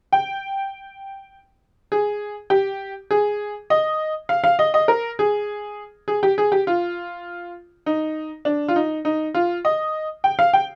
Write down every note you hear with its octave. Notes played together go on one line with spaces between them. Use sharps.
G5
G#4
G4
G#4
D#5
F5
F5
D#5
D#5
A#4
G#4
G#4
G4
G#4
G4
F4
D#4
D4
F4
D#4
D#4
F4
D#5
G5
F5
G5